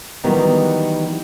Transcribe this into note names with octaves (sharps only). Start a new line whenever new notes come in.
D#3 E3 F#3 G3 B3 D#4